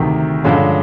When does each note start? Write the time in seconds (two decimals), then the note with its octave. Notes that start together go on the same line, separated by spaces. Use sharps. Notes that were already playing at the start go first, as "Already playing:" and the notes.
Already playing: D2 C3 D#3
0.44 G2 D3 F3 G#3 C#4 F5